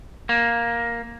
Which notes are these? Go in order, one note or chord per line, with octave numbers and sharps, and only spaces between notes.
A#3